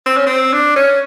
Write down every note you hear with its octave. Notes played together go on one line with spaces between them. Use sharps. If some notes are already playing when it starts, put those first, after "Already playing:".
C4
C#4
C4
D4
C#4